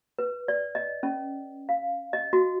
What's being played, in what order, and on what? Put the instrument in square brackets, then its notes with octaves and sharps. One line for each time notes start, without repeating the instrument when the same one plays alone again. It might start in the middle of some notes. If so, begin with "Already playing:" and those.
[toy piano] B4
D5
D#5
C#4
F5
D#5
F#4